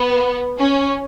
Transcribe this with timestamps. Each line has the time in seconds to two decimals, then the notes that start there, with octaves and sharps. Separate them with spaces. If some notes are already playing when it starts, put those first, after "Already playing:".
Already playing: B3
0.58 C#4